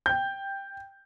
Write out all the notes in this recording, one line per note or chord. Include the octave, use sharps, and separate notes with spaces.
G5 G6